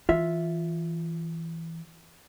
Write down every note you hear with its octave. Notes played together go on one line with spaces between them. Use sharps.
E3 F4 E5